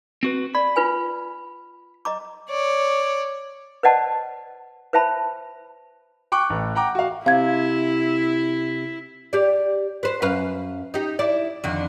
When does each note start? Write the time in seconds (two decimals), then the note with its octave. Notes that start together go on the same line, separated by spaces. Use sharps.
0.23 C4 F#4 B4
0.55 D5 B5
0.76 F4 B4 G#5
2.05 D#5 A#5 D6
2.49 C#5 D5
3.83 B4 C5 D5 D#5 F#5 A5
4.93 B4 C5 E5 A5 B5
6.32 G5 C#6 D6 F#6
6.50 A1
6.75 F#5 G5 A#5 D6
6.95 F#4 F5
7.26 C3 E4 F5 G#6
9.33 G4 D5
10.03 B4 C5
10.22 F#2 B4 F5
10.94 D#4 G4
11.19 E4 D5
11.64 F2 D3 D#3